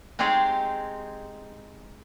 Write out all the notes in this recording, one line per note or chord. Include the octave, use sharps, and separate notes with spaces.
G#3 C4 D#4 G4 G#4 C#5